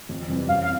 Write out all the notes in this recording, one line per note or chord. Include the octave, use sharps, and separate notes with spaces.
F2
C3 E3 G3 C4
F#2 F5
F5